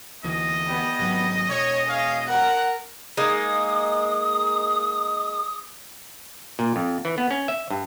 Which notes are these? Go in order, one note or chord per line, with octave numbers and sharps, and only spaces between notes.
D2 E3 D#5
G3 B3
G#1 F#3
E1 C#5
G#4 C#5 F5
A#4 F#5
G#3 A#3 D#4 D#6
A#2
F2
E3
B3
C#4
E5
G2